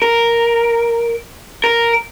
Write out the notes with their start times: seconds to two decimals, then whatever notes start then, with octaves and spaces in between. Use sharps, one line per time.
0.02 A#4
1.64 A#4